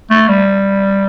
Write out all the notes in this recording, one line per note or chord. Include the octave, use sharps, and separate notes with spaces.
A3
G3